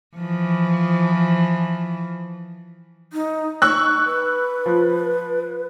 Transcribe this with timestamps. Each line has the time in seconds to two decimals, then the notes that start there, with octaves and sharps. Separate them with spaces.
0.17 E3 F3
3.13 D#4
3.62 D#4 C#6 E6 F#6
4.05 B4
4.66 F3